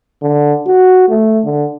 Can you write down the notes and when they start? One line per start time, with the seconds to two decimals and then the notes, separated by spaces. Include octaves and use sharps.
0.22 D3
0.67 F#4
1.09 A3
1.44 D3